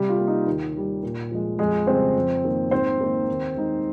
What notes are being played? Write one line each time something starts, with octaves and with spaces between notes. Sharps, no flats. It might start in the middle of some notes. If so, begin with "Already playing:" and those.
Already playing: C3 G3 G4
F4
G3 A#3
D#4
D#2
D#3 G3
A#2
F3 G#3
F2 G#3 G#4
C#3 G3 C4 C5
F2
D#3 A#3
G#2 C4 C5
D#3 A#3 D#4
D#2
D#3 G#3 D#4